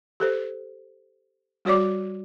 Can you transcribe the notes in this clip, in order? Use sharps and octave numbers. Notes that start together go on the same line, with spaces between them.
G4 A4 C5
G3 F#4 C#5 D5 D6